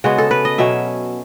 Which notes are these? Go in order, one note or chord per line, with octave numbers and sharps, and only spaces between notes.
C#3 G#3 B3 F#4
A4
B4
D#5
B2 F#3 C#4 E5